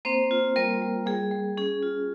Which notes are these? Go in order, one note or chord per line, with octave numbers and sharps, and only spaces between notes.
A#3 C4 C5
F4
G3 A#3 A#4
G3
G3 G#4
G3
C#4 G#4
F4